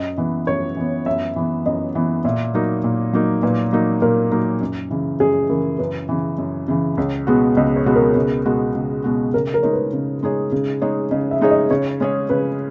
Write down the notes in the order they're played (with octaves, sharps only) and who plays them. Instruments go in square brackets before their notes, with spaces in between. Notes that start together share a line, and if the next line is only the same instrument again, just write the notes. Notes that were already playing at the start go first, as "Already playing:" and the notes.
Already playing: [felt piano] F#2 [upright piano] D#5
[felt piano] E3 B3
[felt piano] F#2 [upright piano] C#5
[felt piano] E3 B3
[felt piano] F#2 [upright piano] E5
[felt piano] E3 B3
[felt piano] F#2 [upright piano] D#5
[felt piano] E3 B3
[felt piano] A#2 [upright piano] E5
[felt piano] F#3 A#3 D#4
A#2
F#3 A#3 D#4
[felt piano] A#2 [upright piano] B4
[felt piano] F#3 A#3 D#4
[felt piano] A#2 [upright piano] A#4
[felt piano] F#3 A#3 D#4
F#2
C#3 E3
[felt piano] F#2 [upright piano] G#4
[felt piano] C#3 E3 [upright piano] A#4
[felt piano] F#2 [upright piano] B4
[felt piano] C#3 E3
F#2
C#3 E3
[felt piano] C#2 [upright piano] C#5
[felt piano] B2 G#3 B3 F#4
[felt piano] C#2 [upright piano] D#5
[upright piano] C#5
[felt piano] B2 G#3 B3 F#4
[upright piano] A#4
[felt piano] C#2
B2 G#3 B3 F#4
C#2
B2 G#3 B3 F#4
[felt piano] C#3 [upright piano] A#4
[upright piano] A#4
[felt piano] G#3 D#4 G#4 C#5
[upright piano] B4
[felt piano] C#3
G#3 D#4 G#4 C#5
C#3
G#3 D#4 G#4 C#5
[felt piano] C#3 [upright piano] D#5
[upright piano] E5
[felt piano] G#3 D#4 G#4 C#5
[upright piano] D#5
[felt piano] C#3 [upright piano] C#5
[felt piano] G#3 C#4 G#4 C#5
[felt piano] C#3 [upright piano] B4